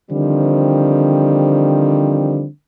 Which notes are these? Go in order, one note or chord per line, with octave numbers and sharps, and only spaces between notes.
D3 D#3 F3 G3 C4